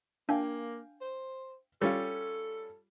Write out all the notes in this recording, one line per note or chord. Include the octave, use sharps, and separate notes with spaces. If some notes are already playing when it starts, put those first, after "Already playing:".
A#3 D4 F5 G5 G#5
C5
G3 C#4 F4 A4